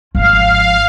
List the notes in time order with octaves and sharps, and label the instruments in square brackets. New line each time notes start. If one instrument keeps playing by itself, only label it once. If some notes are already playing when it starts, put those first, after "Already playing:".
[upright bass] G#1 F3 [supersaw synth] F5